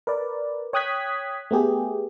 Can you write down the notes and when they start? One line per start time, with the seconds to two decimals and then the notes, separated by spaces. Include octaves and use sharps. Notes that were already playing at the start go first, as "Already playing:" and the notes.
0.07 A#4 B4 D5
0.73 C#5 G5 D#6 F#6 G#6 B6
1.51 A3 B3 G4 G#4